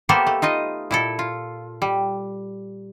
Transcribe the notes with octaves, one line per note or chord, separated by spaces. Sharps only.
A#3 B3 G4 A4 A#4 C5
A3
D#4 F4 D#5
A#2 E4 A4
F4
G3